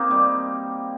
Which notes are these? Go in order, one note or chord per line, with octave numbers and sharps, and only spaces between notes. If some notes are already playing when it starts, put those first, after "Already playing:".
Already playing: A#3 C4 D#4
G3